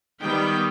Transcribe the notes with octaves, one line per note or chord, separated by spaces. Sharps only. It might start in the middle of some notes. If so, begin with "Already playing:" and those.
D#3 G3 B3 G5